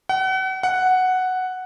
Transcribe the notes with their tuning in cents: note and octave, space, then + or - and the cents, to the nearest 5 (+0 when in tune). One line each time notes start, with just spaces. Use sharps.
F#5 +35
F#5 +0